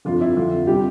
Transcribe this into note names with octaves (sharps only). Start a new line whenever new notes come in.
G1 F2 C3 F4
E4
G1 F2 D3 F4
C3 G3 G4